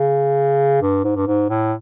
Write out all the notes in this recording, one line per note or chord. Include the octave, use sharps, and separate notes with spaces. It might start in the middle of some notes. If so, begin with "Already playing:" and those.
Already playing: C#3
G2
G#2
G2
G#2
A2